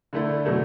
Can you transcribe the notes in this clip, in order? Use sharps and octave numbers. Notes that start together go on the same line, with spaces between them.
D3 A3 E4 A4
B2 F#3 A3